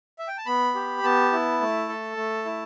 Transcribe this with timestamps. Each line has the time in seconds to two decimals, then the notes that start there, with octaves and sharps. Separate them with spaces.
0.19 E5
0.28 G5
0.38 A5
0.46 B3 B5
0.75 G4
1.03 B3 A5
1.32 E4
1.61 A3
1.89 A4
2.17 A3
2.45 E4